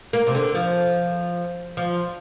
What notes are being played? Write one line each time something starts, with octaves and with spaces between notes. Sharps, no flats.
A#3
C3
D3
F3
F3